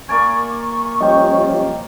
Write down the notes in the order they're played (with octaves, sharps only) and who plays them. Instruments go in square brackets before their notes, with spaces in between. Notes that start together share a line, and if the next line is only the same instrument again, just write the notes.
[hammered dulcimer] A#3 D5 G#5 [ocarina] C#6
[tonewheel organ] F3 G3 C#4 [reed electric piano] D#5 G5